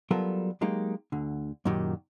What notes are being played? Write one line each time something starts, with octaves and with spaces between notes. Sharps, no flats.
F#3 G3 B3 F4 A4 A#4
F#3 G#3 A#3 D#4 G4
D2 D3
F#2 A#2 D#3 F#3 G4